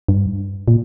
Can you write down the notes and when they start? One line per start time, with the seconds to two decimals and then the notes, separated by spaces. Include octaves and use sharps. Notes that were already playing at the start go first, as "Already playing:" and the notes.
0.08 G2
0.68 A#2